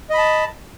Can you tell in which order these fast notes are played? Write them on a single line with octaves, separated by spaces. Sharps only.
D#5 B5 A5